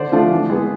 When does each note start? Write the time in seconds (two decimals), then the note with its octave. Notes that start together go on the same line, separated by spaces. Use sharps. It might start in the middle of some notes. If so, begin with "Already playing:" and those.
Already playing: D3 C5 D5
0.12 F3 A3 D4 F4
0.31 E3
0.50 G#3 B3